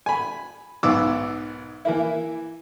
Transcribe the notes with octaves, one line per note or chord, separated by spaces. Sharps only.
G#5 B5
B1 G#2 D#3 B3 D6 E6
E3 A#3 E4